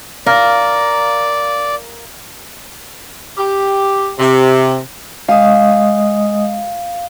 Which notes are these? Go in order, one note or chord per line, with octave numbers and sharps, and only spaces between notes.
A#4 D5 F5
G4
C3
G#3 D#5 F5 D#6